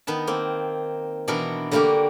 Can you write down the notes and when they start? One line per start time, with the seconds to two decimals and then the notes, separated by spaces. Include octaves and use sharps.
0.07 D#3 B3 B4 A5
0.27 A#3 C4
1.28 B2 E3 D4 F#4 A#4 B4
1.71 D3 G3 A#3 F#4 G4 A#4